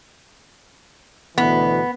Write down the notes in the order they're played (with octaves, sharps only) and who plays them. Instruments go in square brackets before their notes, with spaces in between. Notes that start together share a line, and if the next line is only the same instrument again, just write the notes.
[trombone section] D2 B2 E3 [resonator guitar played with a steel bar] B3